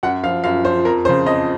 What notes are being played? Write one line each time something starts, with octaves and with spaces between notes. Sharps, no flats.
F#2 F#5
F3 F5
F#2 F5
F3 C5
F2 A#4
C#3 F3 C5
F2 D#5